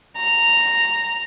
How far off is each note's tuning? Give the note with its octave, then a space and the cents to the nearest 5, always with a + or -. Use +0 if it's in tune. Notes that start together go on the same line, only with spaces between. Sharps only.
A#5 -10